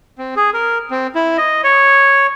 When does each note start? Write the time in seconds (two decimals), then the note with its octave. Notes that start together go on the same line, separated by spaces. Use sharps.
0.18 C4
0.36 G#4
0.54 A#4
0.91 C4
1.15 E4
1.37 D#5
1.64 C#5